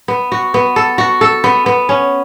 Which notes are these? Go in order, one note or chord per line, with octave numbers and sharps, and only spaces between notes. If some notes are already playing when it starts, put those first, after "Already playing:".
B3
F#4
B3
A4
F#4
A4
B3
B3
C#4